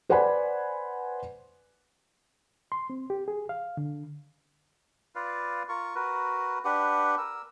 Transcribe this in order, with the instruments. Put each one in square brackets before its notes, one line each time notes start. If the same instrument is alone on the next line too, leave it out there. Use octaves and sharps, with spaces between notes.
[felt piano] B4 C5 D5 F#5 G#5 B5
[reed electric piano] C6
C4
G4
G#4
F5
D3
[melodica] F4 B4 D5 F5
F4 A#4 C#6
F#4 A#4 B4
D4 G4 B4 F#5
A#4 E6